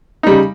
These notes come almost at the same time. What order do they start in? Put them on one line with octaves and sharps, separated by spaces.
D#4 G3 C#3